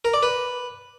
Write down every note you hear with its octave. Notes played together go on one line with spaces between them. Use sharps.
A#4
D5
B4